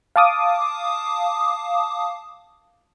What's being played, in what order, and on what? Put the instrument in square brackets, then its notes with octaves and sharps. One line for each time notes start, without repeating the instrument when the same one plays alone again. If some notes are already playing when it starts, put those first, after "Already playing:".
[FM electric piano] F5 A5 D6 D#6